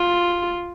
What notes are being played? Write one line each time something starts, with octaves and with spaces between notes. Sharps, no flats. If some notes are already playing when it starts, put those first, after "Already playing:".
Already playing: F4